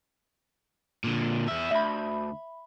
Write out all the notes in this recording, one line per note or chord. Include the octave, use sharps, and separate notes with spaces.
A#2 D3
E2 E5
D2 E5 B5